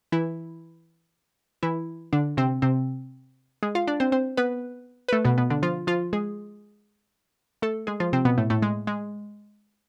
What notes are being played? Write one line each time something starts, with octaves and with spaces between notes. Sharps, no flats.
E3 E4
E3 E4
D3 D4
C3 C4
C3 C4
G#3 G#4
F4 F5
D4 D5
C4 C5
C4 C5
B3 B4
B4
A3 A4
B2 B3
B2 B3
D3 D4
F3 F4
F3 F4
G#3 G#4
A3 A4
G#3 G#4
F3 F4
C3 C4
B2 B3
A2 A3
A2 A3
G#3
G#3